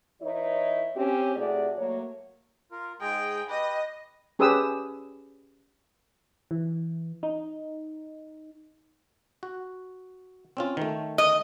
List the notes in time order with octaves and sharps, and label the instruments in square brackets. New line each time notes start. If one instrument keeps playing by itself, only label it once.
[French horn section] E3 D#4 E4 B4 C#5
C4 C#4 G4
C3 A3 E4 F#4 G#4 D5
F#3 A3 A#3 C#5
[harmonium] F4 A#4
[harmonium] G#2 G#3 A#5 [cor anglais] G#4 [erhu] G5
[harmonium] G4 [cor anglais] B4 [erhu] D#5
[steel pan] C#4 G4 G#4 B4 D#6 E6
[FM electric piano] E3
D#4
[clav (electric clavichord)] F#4
C4 C#4 F4
D#3 A3
[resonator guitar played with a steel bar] D#5